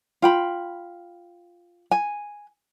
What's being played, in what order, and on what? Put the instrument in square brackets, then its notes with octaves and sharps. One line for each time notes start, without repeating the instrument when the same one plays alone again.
[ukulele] F4 G5 B5
G#5